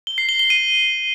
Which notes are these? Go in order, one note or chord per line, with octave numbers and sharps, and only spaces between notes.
G7
C7
G7
G7
D#7